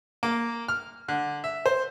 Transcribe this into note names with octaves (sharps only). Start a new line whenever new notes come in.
A#3
F6
D3
E5
C5